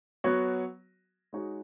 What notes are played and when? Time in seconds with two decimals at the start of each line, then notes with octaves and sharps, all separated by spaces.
0.24 F#3 B3 F#4 C#5
1.33 G#3 D#4 F#4 C#5